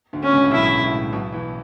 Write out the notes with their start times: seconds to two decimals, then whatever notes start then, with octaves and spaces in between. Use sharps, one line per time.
0.13 D2 D3
0.23 C#4
0.32 C#2 C#3
0.43 A2
0.52 B1 B2 E4
0.83 A2
1.13 B1 B2
1.33 E2 E3